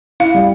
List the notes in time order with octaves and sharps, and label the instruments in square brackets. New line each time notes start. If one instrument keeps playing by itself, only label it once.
[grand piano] E4 [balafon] F5
[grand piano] G3